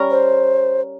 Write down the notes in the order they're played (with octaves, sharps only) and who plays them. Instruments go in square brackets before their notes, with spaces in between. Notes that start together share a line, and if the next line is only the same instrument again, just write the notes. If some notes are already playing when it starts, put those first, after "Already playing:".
Already playing: [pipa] G3 C#4 A#4
[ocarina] C5